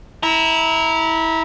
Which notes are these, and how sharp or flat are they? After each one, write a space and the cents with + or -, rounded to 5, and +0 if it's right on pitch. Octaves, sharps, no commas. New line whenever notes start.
E4 -20 A#5 -5